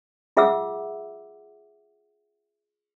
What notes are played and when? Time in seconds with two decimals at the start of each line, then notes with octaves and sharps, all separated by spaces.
0.37 F4 G#4 E5 F#5 D6 E6